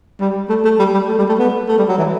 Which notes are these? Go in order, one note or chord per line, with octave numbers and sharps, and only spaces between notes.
G3
A3
A3
G3
G3
A3
G3
A3
B3
A3
G3
F#3
E3